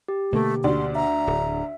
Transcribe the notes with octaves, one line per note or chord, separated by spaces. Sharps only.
G4
B2 D3 A3 A#3
D2 F#4 D5 C6
E5 A#5
D1